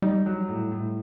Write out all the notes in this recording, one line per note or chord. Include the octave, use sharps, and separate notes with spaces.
G3 D#4
F#3
A2
A2